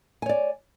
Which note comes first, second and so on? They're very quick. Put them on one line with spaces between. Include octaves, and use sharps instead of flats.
G#5 C#5 D5